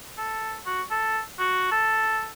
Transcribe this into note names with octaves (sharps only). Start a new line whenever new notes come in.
A4
F#4
A4
F#4
A4